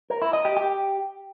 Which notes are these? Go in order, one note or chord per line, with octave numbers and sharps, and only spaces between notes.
A#4
E4
D#5
G4
G4